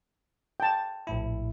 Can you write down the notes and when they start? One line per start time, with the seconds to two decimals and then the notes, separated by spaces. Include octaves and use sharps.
0.60 G5 A5
1.07 A#1 A2 E4